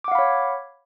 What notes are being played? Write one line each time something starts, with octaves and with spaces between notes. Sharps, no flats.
C#5 F5 F#5 B5 D6